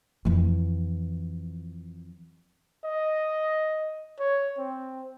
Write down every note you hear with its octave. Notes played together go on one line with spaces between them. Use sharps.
F2 E3
D#5
C#5
C4